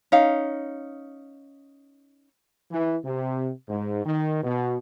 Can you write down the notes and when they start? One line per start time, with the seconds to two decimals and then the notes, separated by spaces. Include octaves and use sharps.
0.12 C#4 D#4 F5
2.71 E3
3.05 C3
3.69 G#2
4.06 D#3
4.43 B2